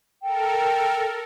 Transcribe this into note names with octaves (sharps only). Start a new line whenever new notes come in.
A4 A#4 G5